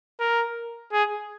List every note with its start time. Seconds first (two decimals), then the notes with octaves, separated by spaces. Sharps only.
0.20 A#4
0.93 G#4